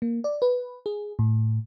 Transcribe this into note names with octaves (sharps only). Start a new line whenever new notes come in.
A#3
D5
B4
G#4
A2